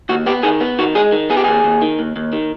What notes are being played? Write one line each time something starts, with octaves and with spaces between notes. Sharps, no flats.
D#2 F#4
B3 G4
D#3 G#4
B3
D#3 F#4
G#3 G#4
D#3
B3 G#4
G4
D#2 G#4
D#2
D#3
D#2
D#2
D#3